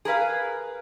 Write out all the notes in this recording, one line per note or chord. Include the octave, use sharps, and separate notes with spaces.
G#4 A#4 B4 F5